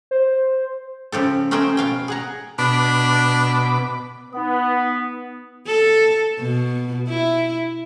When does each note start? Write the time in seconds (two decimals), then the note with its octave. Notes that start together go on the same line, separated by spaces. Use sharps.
0.11 C5
1.12 C#3 F3 G4 A4
1.51 A3 A#3 C#4 C5 D#5 G5
1.77 B2 F5 G5
2.08 G#4 F#5 A#5
2.59 B2 D4 B5 D6
4.33 B3 D#4 F#5 D#6
5.66 A4
6.39 B2
7.09 E4